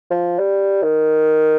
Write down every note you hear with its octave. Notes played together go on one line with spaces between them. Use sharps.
F3
G3
D#3